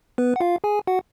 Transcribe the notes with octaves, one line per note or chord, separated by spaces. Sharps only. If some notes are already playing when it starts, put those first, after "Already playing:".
B3 B4
F#5
F4 F5
G#4 G#5
F#4 F#5